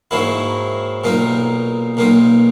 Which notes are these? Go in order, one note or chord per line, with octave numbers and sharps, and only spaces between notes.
G#2 D#3 F#3 A#3 E4
B1 A#2 A#3 D#4
B1 A#2 A#3 D#4